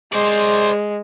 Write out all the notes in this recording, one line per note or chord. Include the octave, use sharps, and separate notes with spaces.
G#3 C5 D5